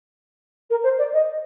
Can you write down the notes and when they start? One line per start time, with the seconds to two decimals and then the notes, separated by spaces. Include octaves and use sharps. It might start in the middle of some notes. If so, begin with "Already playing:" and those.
0.70 A#4
0.83 C5
0.98 D5
1.13 D#5